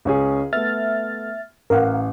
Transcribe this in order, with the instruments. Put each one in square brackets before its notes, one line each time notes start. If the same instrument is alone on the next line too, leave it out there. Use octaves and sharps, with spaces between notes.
[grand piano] C#2 C#4 G#4
[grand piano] A3 B3 [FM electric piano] E5 F6 A6
[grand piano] A1 [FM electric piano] A#4 F5 F#5